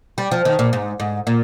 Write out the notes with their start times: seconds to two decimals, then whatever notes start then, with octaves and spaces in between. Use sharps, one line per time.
0.18 G3
0.32 F3
0.45 D#3
0.59 A#2
0.73 G#2
1.00 G#2
1.27 A#2